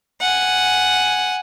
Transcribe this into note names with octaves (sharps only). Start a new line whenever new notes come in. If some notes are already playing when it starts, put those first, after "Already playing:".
F#5 G#5